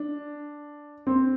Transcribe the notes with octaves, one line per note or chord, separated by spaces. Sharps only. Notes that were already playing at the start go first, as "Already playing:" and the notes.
Already playing: D4
C4